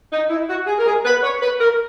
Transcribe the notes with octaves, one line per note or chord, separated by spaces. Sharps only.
D#4
E4
F#4
G#4
A#4
G#4
B4
C#5
B4
A#4